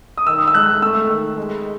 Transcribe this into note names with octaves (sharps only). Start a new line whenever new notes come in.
D#6
D#3 E6
E6
G#2 F#6
A3 E6
D#3
G#3